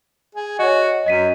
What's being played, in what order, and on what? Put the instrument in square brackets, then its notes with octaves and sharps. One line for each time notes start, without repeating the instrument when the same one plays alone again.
[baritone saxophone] G#4
[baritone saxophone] F#4 [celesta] C#5 D#5
[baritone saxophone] F#2 [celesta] D#5 B6 D#7